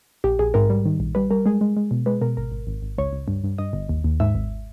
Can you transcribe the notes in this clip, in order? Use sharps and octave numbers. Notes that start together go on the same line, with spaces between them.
A#1 G4
A#1 G#4
G#2 A#4
G3
D#3
A#1
G3 B4
G3 A#4
G#3 G#4
G#3
G#3
B2
G#3 B4
B2 A#4
G#1 A#4
G#1
G#1
G#1
C#2 C#5
C#2
G2
G2
G2 D#5
G1
D#2
D#2
G#2 E5
G#1